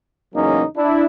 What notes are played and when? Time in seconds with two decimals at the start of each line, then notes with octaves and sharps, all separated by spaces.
0.34 E2 C#3 F#3 A#3 C#4 D#4
0.77 D4 E4